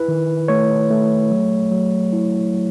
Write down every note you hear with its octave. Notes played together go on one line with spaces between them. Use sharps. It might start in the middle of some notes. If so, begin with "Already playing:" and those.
Already playing: E4 B4
D#3
A3 C#5
A3
F#3
F#3
E4
F#3